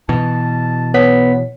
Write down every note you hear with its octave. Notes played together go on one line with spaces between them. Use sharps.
B2 E3 A5
B3 C#5 B6